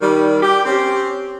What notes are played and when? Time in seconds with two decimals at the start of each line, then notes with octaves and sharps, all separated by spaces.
0.01 D#3 G3
0.42 G4
0.66 C4 C#4 G4